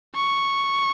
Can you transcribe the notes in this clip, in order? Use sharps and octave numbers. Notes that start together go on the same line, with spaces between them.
C#6